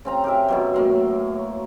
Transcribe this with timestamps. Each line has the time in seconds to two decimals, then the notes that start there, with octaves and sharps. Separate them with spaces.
0.05 C#3 C4 A#5
0.24 G4 A#4 E5
0.48 F#2 B2 F#3
0.74 A2 A#3 C6